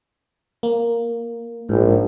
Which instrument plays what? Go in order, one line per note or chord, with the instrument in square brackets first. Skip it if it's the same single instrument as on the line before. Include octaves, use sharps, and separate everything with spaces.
[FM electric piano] A#3
[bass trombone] A#1 [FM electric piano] G#2